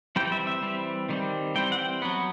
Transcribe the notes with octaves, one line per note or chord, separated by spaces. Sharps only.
E3 G3 C4 G5
E5
E5
E3 G3 C4
D#3 G3 C4
E3 G3 C4 G5
F#5
G5
F#3 B3